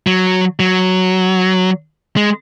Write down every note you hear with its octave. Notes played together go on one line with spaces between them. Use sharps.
F#3
F#3
G#3